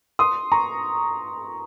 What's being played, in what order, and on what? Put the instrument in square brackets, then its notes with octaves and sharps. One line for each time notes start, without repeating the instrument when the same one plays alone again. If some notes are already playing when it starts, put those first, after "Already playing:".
[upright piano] C6 D#6
A#5 C#6